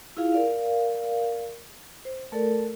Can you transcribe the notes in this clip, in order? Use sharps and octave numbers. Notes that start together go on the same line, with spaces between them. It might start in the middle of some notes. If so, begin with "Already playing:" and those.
E4 F4 G#4 F5
A#4 D5 F5
C5
A3 A4 A#4 D5